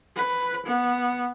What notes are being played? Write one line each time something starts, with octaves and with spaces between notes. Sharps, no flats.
B4
B3